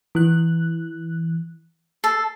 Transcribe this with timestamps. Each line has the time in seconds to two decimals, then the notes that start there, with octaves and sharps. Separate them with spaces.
0.15 E3 F#6
2.04 A4 C7